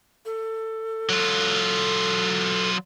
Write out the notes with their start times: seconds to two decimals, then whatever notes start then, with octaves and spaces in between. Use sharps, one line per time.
0.25 A4
1.09 F#3 F4